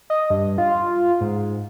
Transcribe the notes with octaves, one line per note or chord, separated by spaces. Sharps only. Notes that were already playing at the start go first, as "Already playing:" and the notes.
D#5
G2
F4
G#2